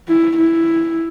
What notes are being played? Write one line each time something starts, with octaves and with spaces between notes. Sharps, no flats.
E4
E4